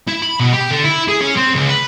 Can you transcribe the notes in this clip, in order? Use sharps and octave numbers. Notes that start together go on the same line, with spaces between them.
E4
B5
B2
G4
D3
E4
G#4
C#4
C4
C#2
B4